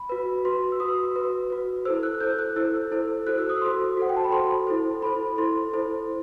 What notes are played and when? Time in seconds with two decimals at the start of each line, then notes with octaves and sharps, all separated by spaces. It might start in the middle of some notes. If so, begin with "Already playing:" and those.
Already playing: B5
0.09 F#4 B4
0.45 F#4 B4 C6
0.72 E6
0.80 F#4 B4 D#6
1.16 F#4 B4
1.50 F#4 B4
1.85 E4 A4 C5 E6
2.03 F#6
2.20 E4 A4 C5 G6
2.39 F#6
2.56 E4 A4 C5 E6
2.92 E4 A4 C5
3.27 F#4 A4 C5 F#6
3.38 E6
3.50 D#6
3.61 F#4 A4 C5 C6
3.97 F#4 A4 C5 F#5
4.09 G5
4.17 A5
4.24 B5
4.32 F#4 A4 C5 C6
4.67 E4 A4 C5
5.02 E4 A4 C5 B5
5.38 E4 A4 C5 C6
5.73 E4 A4 C5